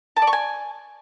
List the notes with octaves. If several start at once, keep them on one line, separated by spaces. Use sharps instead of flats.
A5
D5
C#6
G#5